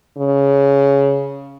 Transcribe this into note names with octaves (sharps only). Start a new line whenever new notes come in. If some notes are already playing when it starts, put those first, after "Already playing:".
C#3